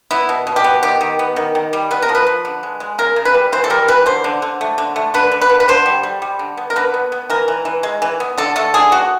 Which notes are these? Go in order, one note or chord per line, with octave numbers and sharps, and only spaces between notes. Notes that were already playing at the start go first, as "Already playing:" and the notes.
B3 E4
B2
B2
G4
B3
D#3 G4
D#3
B3
D#3
D#3
G3
B3 B4
A#4
F3
B4
F3
D3
G#3
G#3
C#3 A#4
C#3
B4
G3
E3 C5
A4
G3 A#4
E3 B4
D3 C5
D3
D3
A3
D3
A3
D3 B4
D3
B4
D3
B4
D3 C5
G3
G3
G3
D3
B3
A#4
D3 B4
B3
B3
E3 A#4
E3
E3
G#3
E3
B3
D3 A4
A3 A4
D3 G#4
D3 F#4